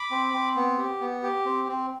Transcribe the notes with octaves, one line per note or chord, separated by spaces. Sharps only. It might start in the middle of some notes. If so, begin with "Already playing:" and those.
Already playing: B5 D6
C4
C4
B3
G4
B3
G4
C4
C4